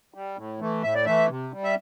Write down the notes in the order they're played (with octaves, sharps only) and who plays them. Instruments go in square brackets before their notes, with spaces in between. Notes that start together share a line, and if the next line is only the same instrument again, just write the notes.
[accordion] G3
A2
E3 A3
A2 E5
D5
E3 A3 E5
C3
G3
E5